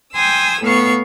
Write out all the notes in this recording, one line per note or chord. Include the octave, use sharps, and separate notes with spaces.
G5 G#5 C6 D#6 E6
A2 B3 F5 C#6